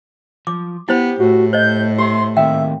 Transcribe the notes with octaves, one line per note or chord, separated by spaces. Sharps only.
F3 D6
B3 E4 G4 C5 B5
A2 F#4
C5 D#5 G6
G4 C5 E5 C6
D#3 A#3 C4 E5 G5